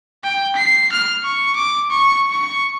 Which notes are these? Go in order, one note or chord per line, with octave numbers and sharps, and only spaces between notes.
G5
C7
F6
C#6
D6
C#6
C#6